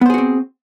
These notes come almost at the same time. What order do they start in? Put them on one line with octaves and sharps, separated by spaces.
B3 C5 G#4 F#4 C4